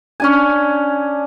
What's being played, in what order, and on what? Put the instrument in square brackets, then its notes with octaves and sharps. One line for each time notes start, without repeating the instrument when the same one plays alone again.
[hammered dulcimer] C#4 D4 G#5